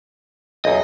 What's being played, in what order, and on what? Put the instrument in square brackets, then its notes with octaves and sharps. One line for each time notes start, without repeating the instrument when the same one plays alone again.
[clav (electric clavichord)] B1 E2 [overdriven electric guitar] D#5